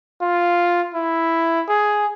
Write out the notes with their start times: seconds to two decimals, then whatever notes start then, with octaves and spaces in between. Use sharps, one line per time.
0.22 F4
0.95 E4
1.69 G#4